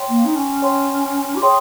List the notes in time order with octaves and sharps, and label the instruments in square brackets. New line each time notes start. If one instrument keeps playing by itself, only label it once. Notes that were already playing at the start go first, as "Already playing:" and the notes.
Already playing: [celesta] C#5 G5 C6
[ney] A#3
D#4
C#4
[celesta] C#5 G5 C6
[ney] G4
[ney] G#4 [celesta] C#5 G5 C6